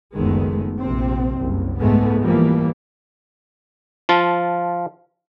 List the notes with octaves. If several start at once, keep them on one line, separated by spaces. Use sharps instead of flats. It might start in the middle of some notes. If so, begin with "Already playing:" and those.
F#1 C#2 D#3 G#3 A3 B3
A#1 C3 C4
F#1 C2
G#2 G#3 A3 B3
E3 F3 G3 A#3
F3 F4 A5